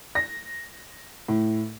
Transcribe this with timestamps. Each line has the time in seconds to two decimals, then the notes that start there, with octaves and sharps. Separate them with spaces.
0.15 A#6
1.28 A2